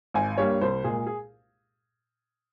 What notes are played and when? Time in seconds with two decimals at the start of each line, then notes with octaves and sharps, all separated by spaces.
0.14 G#1 G#5
0.38 G2 G3 A#3 C#5
0.61 C2 C5
0.84 A#2 G#3 G#4
1.07 G#4